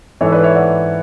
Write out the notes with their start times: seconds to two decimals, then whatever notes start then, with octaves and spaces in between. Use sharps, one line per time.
0.21 G#2 E3 A4 C#5
0.32 B4 D5
0.43 C#5 E5
0.55 D5 F#5